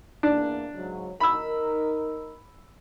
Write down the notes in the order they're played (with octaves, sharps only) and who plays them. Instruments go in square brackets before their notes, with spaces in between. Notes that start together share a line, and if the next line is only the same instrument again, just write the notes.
[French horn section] E2 A#3 [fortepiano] D4
[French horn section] G#2 C#3 F#3
[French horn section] D#4 A#4 [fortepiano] B5 E6